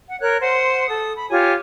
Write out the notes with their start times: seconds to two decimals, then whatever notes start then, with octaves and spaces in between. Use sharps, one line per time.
0.07 F#5
0.21 A#4 C#5 F#6
0.40 C5 F#5 C6
0.89 A4 D#6
1.17 B5
1.30 F4 G4 C#5 G#5